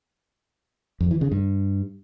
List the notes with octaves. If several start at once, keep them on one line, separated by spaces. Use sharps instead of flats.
F2
E3
C#3
G2